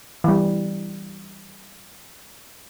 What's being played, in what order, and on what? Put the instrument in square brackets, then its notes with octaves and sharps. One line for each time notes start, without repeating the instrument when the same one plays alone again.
[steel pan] E3 G3